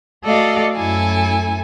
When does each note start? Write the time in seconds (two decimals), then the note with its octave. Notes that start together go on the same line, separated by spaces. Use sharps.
0.24 A3 F#4 A4 D5 D#5 F5
0.76 F#2 A3 E4 A4 G#5